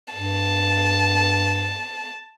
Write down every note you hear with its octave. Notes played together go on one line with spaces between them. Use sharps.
G2 A5